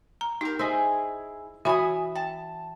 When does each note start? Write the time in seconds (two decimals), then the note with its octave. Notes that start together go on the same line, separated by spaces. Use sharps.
0.21 A#5
0.41 D#4 G4 A#4
0.59 E4 G#4 C5 D#5
1.65 E3 F#4 C#5 E5 G#5 B5 D#6
2.16 G5 A5